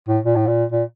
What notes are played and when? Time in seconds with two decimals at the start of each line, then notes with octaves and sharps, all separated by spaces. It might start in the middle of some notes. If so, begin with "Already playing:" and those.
0.08 A2
0.25 A#2
0.36 A2
0.47 A#2
0.72 A#2